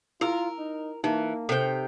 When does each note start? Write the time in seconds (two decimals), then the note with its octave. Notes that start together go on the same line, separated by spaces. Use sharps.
0.21 E4 F4 A#4 E6
0.59 D#4
1.04 E3 A#3 D#4
1.49 C3 A4 C5 G5